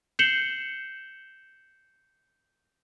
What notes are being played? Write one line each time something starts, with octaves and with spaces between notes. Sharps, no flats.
G6 C7 C#7 E7 F#7 G7